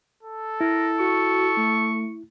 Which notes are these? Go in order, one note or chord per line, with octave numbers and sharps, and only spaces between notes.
A4
E4 A#4
F#4 C#6
A3